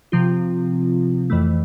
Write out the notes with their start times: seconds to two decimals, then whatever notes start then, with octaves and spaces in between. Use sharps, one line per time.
0.12 C3 F3 C4 F4
1.30 F2 E3 A3